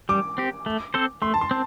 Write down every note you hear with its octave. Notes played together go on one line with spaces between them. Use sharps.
G3 D6
C4 G4
A3
C4 A4 C5
A3 C6
A5
C6
C4